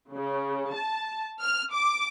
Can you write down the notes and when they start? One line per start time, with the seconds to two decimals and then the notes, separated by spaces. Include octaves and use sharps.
0.13 C#3
0.75 A5
1.41 F6
1.72 D6